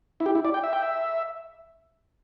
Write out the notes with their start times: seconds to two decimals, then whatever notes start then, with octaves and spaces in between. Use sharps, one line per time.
0.20 E4
0.26 G4
0.35 E4
0.45 D5
0.54 G5
0.64 E5
0.73 G5
0.83 E5